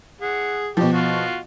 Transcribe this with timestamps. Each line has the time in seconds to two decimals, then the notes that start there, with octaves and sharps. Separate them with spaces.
0.21 G#4 F#5
0.77 B2 F3 G4
0.92 F4 F#4